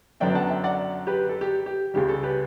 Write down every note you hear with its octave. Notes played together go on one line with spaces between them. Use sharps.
F#2 D3 F#3 B3 D4 E5 G5
F#5 A5
E5 G5
D5 F#5
G4 B4
A4
G4
G4
C#2 C#3 G3 G4
A4
G4 B4